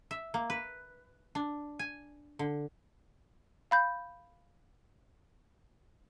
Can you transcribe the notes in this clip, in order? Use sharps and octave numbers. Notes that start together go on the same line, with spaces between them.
E5
A#3
B4
D4
G#5
D3
F5 B5 G6